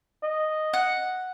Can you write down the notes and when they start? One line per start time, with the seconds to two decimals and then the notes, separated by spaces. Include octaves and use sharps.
0.23 D#5
0.73 F#5